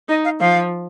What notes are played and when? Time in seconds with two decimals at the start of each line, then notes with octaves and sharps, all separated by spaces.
0.08 D#4 D#5
0.25 F5
0.40 F3 F5